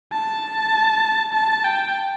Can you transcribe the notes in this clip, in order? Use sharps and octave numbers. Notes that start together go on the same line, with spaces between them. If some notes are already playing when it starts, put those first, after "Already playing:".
A5
A5
G5